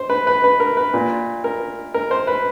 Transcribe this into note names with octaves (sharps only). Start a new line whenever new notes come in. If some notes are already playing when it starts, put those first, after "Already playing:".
Already playing: C5
B4
B4
B4
A#4
B4
A#2
A#4
A#4
C5
B4